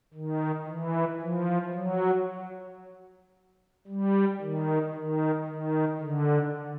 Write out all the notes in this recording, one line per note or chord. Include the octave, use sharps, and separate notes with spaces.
D#3
E3
F3
F#3
G3
D#3
D#3
D#3
D3